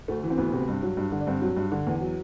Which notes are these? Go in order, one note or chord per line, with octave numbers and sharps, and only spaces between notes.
D2 A3
E3
C4
D2 B3
C3
G2
F#3
G2
D3
D4
G2 C4
F#3
G2
D3
E2
F#3